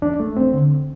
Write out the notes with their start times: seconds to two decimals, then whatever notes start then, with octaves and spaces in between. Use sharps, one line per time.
0.02 E2 D4
0.20 A3
0.37 E2 C4
0.53 D3